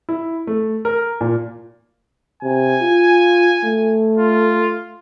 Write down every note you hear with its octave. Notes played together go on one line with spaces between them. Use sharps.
E4
A3
A#4
A#2
C3 G#5
F4
A3
F4